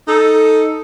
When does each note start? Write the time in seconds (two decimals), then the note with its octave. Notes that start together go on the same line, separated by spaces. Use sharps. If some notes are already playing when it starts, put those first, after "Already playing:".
0.07 D#4 A4